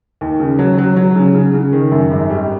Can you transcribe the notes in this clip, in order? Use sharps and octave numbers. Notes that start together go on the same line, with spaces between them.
D#2
C#3
F#3
F#3
F#3
C#3
C#3
C#3
D#3
F#2
G#1
G3